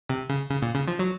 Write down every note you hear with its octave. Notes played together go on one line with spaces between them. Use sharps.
C3
C#3
C#3
A#2
C#3
F3
F#3